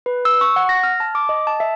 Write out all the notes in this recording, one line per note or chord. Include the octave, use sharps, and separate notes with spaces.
B4
E6
C#6
F#5
A#6
F6
A5
D6
D#5
A5
E5